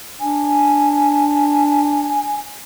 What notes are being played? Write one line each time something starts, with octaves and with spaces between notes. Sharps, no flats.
D4 G#5